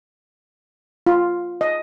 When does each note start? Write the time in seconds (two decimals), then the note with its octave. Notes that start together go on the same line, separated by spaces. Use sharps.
1.07 F4
1.61 D#5